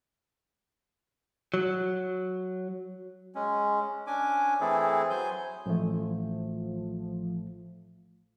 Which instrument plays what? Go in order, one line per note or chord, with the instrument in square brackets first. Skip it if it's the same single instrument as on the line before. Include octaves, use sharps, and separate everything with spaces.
[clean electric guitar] F#3
[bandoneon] G#3 C#4
C#4 D4 G#5 D6
E3 A3 C4 E4 G#4 A4
F#3 C5 G#5 G6
[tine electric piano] A1 A3 [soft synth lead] F3